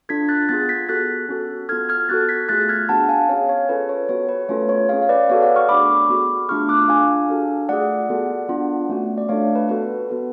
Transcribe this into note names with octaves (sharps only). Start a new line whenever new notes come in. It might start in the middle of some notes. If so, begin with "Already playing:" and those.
D4 F4 A4 G#6 B6
F#6 A6
B3 F4 G#4 F#6 A6
G#6 B6
B3 F#4 A4 F#6 A6
C#4 F#4 A4
B3 F4 A4 F6 G#6
F6 G#6
B3 F#4 A4 F#6 A6
G#6 B6
A3 F4 G#4 F#6 A6
F6 G#6
B3 D4 F#4 F#5 A5
F5 G#5
C#4 G#4 C#5 F5
C#5
C#4 F4 A4 B4
C#5
B3 F#4 A4 C#5
B4
A3 C#4 F4 A4 C#5
C#5
C#4 G#4 C#5 F5
F5
B4 D5
B3 F#4 A4 C#5 F5
D5 F#5
C#6 F6
A3 D4 G#4 B5 D6
B3 F#4 A4
A3 D4 F4 G#4 C#6 F6
D6 F#6
D4 F4 G#4 F5 G#5
D4 F#4 A4
A3 F4 G#4 D5 F#5
B3 F#4 A4
B3 D4 F4
A3 C#4 F#4
D5
A3 D4 F4 A4 C#5 F5
B4
B3 F#4 A4 B4
B3 F#4 A4